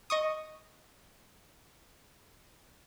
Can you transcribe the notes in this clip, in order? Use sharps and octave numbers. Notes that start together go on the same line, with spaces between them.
D#5 C#6 D#6